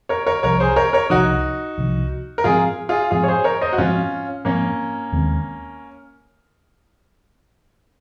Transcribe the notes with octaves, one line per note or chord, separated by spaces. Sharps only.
A#4 C#5
A#4 C#5
C2 C3 F3 A#4 C#5
G#4 C5
A#4 C#5
A#4 C#5
C2 C3 F3 D#4 F#4
C2 C3 F3
A#4
G#2 F3 C4 F4 G#4
F4 G#4
G#2 F3 C4 F4 G#4
C#5
G#4 C5
A#4 C#5
C5 D#5
F#4
G#2 F3 C4 C#4 F4
G#2 F3 A#3 C4 C#4
D#2 D#3 G#3 C4